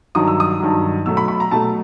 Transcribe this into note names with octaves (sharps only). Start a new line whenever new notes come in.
G2 D#3 F#3 D#6
E6
D#6
G2 D#3 F#3
B2 F#3 A3 E6
B5
B5
A#5
B2 F#3 A3 A5